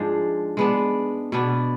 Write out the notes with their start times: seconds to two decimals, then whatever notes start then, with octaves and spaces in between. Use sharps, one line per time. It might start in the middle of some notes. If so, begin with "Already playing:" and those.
Already playing: G#2 F3 G#3 D4
0.57 G#3 B3 D4
1.32 B2 B3 D4